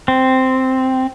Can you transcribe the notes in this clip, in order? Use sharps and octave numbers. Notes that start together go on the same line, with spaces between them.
C4